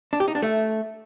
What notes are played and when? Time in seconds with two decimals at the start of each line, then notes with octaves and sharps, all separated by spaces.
0.13 D4
0.20 G4
0.28 D#4
0.35 D4
0.42 A3